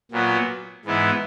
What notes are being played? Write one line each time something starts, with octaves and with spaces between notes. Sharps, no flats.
A#2 F#3 B3
G#2 E3 B3 E4